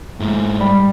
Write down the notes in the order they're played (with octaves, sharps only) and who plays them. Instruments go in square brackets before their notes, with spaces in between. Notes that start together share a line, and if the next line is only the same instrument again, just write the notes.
[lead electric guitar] G#2 E4
[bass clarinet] G3